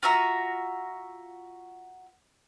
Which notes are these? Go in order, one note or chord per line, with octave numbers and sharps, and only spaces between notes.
F4 F#4 E5 A#5